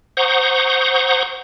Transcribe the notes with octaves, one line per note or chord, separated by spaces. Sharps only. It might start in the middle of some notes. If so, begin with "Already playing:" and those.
C5 F#5 A#5 C#6 D#6 G6